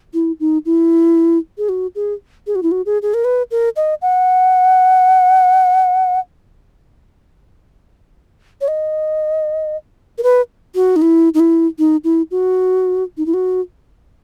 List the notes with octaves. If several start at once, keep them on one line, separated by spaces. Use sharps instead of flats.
E4
D#4
E4
G#4
F#4
G#4
G#4
F#4
E4
F#4
G#4
G#4
A#4
B4
A#4
D#5
F#5
C#5
D#5
A#4
B4
F#4
D#4
E4
D#4
E4
D#4
E4
F#4
D#4
E4
F#4